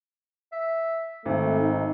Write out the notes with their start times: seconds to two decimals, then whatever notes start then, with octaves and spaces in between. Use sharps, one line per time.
0.52 E5
1.25 G#1 A3 C4
1.59 D#4